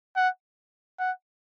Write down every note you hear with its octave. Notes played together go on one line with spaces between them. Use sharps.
F#5
F#5